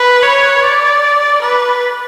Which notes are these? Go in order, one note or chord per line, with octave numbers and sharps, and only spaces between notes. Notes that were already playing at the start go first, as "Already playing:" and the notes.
Already playing: B4
C#5
D5
B4